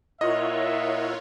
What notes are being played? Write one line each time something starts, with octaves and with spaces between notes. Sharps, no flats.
A#2 E4 F4 A#4 C#5 D#5 E5 F#5